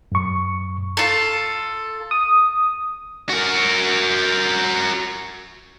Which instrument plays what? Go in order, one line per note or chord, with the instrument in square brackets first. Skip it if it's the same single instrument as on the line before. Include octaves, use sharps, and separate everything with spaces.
[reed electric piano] F#2 C#6
[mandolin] F4 A4
[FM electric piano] D#6
[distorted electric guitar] F#4 A#4